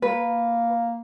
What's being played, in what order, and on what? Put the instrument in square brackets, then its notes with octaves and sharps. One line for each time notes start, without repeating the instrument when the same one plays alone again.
[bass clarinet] A#3 [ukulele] B4